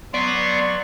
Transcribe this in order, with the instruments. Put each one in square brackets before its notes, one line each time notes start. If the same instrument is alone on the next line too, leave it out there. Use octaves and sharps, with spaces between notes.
[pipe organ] F#3 C#6 [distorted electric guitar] B3 [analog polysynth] D5 [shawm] C6